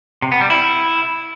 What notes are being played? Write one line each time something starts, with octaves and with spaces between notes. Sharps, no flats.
C3
B3
G3
E4